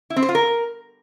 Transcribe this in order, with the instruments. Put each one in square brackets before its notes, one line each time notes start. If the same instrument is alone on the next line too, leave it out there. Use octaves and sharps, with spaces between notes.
[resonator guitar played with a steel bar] E4
C4
C5
F4
A#4